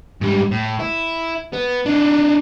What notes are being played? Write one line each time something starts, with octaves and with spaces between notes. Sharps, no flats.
G#2 G3
A2
E4
B3
D4 D#4